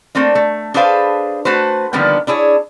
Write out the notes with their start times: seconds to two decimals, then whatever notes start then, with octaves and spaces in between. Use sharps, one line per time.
0.15 A3 A#3 C4 D4
0.35 A3
0.74 D4 G#4 A4 B4 C5 F5
1.45 A3 F#4 B4 C5
1.93 D3 D#3 F3 G3 A#3 B3
2.27 D4 E4 G#4 C#5